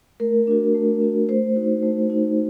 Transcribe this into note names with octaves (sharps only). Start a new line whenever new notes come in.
A3 A#4
D4 F#4
A3
D4 F#4
A3 C5
D#4 F#4
A3
D#4 F#4